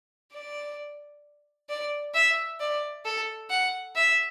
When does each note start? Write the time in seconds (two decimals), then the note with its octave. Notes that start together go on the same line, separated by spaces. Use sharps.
0.33 D5
1.69 D5
2.14 E5
2.60 D5
3.05 A4
3.50 F#5
3.96 E5